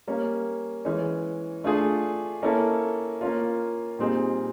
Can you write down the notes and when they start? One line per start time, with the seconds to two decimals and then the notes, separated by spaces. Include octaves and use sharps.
0.07 G3 A#3 C#4
0.85 E3 G#3 C#4
1.64 A3 D4 F4 G#4
2.43 A#3 C#4 E4 A4
3.21 A#3 C#4 F4
3.99 A#2 G3 C4 D#4 G#4